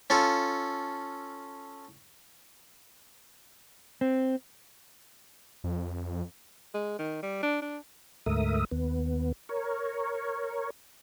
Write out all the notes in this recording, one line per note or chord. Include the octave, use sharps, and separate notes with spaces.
C#4 F4 A4
C4
F2
G#3
D#3
G3
D4
D4
D2 G#2 A3 A#4 E5 D#6
D#2 B3
A#4 C#5